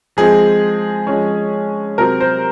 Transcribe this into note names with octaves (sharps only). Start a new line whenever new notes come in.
F3 G#3 C4 G#4
F3 G#3 C#4
C3 F#3 C4 A#4
C5